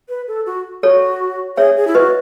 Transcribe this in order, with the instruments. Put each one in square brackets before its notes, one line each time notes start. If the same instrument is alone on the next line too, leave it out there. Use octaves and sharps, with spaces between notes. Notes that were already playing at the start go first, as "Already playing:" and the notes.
[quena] B4
A4
F#4
[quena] F#4 [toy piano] A4 C#5
[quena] G#4 [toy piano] C#5 E5
[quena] G#4
E4
[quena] F#4 [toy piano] B4 D#5